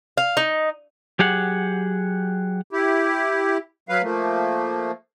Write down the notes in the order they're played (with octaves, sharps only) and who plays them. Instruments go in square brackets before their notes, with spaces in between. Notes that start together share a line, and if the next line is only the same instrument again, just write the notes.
[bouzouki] F5
D#4
[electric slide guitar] F#3 G4 G#4 F#5
[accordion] E4 G4
F#3 B4 F5
F3 A3 A#3